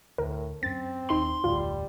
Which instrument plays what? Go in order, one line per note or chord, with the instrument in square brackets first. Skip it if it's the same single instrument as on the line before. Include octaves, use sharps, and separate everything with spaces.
[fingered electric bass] D2 [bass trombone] A2 [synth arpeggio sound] A#4
[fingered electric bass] F#2 C#4 [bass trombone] C4 [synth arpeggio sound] A6
[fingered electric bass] D#1 [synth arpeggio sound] D#4 [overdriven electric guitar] C6
[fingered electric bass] F1 D2 A2 [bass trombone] G3 [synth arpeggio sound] F4